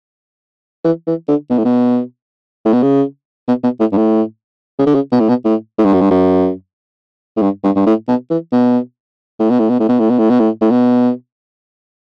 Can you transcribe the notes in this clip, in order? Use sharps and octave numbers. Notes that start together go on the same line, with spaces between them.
E3
E3
D3
B2
A2
B2
A2
B2
C#3
B2
B2
A2
G2
A2
C#3
D3
C#3
B2
A2
B2
A2
A2
G2
F#2
G2
F#2
A2
G2
G2
G2
A2
B2
E3
B2
A2
B2
A2
B2
A2
B2
A2
B2
A2
B2
A2
A2
B2